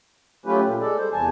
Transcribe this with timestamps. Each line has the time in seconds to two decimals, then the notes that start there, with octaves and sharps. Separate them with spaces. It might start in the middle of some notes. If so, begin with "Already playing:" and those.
0.46 F#3 A3 C#4 F4 G4 B4
0.64 A#2
0.81 G#3 A4 D5
0.98 G3 C5
1.13 E2 C3 E3 G#5 A5